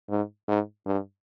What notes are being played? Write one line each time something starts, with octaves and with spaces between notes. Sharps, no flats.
G#2
G#2
G2